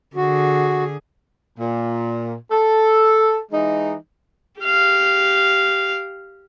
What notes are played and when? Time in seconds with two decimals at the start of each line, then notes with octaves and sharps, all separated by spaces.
0.16 D3 F#4 G#4
1.59 A#2
2.51 A4
3.52 E3 G#3 D#4
4.61 G4 F5